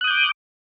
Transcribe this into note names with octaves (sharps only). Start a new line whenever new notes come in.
D6 D#6 F#6 G6